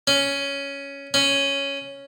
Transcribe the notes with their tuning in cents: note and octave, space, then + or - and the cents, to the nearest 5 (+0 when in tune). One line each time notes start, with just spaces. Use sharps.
C#4 +5
C#4 +0